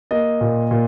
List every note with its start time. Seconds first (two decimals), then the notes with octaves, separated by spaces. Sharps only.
0.11 A#3 D#5
0.41 A#2
0.71 A#2